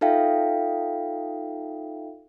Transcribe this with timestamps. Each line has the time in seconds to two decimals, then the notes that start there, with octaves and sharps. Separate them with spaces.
0.01 D#4 F4 A4 E5 F5 G5